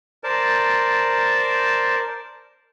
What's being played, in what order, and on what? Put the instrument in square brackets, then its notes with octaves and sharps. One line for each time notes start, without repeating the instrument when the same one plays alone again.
[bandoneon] A#4 C5 D5 A5